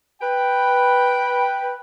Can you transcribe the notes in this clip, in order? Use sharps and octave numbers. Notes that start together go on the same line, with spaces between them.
B4 G5